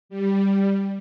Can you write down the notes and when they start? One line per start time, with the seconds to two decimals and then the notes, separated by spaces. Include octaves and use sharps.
0.09 G3